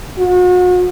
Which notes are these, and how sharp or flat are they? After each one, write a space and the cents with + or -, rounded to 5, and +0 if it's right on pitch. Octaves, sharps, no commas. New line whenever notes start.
F#4 -40